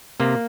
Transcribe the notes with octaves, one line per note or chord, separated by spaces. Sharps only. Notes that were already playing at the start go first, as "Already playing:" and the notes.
C3 A#3